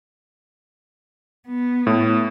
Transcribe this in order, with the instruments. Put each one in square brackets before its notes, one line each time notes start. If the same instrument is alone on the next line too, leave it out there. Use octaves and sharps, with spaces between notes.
[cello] B3
[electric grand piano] A2